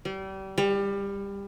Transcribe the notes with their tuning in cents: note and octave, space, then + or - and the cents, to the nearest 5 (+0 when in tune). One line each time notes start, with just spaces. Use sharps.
G3 -30
G3 +25